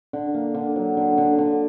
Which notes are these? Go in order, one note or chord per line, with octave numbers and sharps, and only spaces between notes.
D3
A#3
D3
F#3
D3
D3
D3